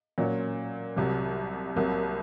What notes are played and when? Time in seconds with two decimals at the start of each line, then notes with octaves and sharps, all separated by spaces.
0.18 A#2 F#3 C#4
0.96 C2 C3 F#3
1.76 C2 C3 F#3 A#3